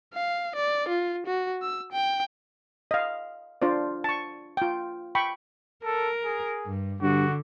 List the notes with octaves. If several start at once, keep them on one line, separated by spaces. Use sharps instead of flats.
F5
D5
F4
F#4
E6
G5
D#5 F5
D4 F4 C5 D5
A5 C#6
F4 G5
G5 B5 C#6
A4 A#4
G#4
G2
G2 D3 F#4